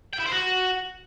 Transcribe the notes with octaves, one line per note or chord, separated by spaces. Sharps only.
G5
E4
C5
F#4